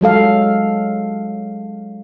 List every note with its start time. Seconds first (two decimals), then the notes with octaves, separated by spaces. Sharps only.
0.01 F#3 G#3 A4 F5